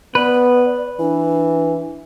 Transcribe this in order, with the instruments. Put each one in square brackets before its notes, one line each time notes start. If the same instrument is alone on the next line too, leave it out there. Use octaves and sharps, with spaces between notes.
[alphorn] B3 [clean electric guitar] B4 [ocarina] D5
[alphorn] E3 [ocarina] D4